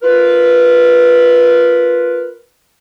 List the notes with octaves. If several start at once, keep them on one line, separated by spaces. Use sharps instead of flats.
F4 A#4 B4